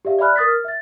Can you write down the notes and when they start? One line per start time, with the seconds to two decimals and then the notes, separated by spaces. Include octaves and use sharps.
0.05 G4 D5 E5 F5
0.19 D5 E5 G#5 B5 F6 F#6
0.36 A#4 D#6 A6 B6
0.48 F6
0.64 E5 A6